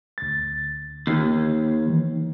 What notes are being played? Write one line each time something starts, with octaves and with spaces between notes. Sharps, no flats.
D2 A6
D#2
E3